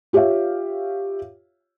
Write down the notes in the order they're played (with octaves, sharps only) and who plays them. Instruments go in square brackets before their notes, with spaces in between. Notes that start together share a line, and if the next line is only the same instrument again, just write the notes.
[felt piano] F4 G4 C#5 E5 F5